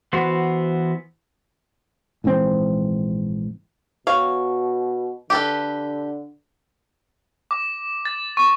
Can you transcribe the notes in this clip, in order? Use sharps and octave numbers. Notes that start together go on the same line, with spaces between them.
E3 B3 F#4 C5
A#1 G#2 E3 C4
B2 C#5 F5
D3 G4 A4 B4
D6
A6
C#6